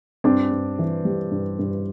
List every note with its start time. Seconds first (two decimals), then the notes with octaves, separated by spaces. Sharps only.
0.24 G2 C4 D4
0.52 G2
0.79 E3
1.05 G3
1.31 G2
1.59 G2